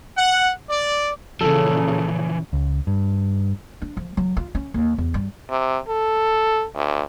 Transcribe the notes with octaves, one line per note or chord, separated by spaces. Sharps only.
F#5
D5
A#2 C#3 E3 F3 A4
C#2
G2
D4
F3
F#3
F4
C#4
D#2
E2
G2
C3
A4
D2